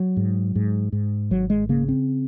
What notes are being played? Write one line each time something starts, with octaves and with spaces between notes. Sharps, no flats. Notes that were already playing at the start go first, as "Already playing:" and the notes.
Already playing: F#3
G#2
G#2
G#2
G#1 F#3
G#3
C#3 A#3
C4